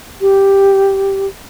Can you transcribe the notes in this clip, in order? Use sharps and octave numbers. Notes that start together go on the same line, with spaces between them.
G4